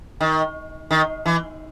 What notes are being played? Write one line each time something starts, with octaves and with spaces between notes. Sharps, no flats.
D#3
D#3
E3